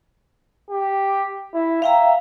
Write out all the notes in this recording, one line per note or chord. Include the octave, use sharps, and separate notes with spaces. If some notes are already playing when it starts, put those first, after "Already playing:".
G4
E4
E5 F5 G5 A#5